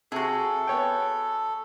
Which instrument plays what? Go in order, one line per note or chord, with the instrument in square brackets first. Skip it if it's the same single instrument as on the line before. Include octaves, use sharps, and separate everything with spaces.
[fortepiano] C3 [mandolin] F#4 G#4 [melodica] A4
[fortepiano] B3 C#5 G5